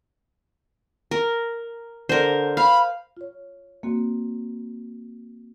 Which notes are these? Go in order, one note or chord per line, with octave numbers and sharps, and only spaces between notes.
A#4
D3 A#4 C5
F5 B5
F4 C#5
A#3 C4 F#4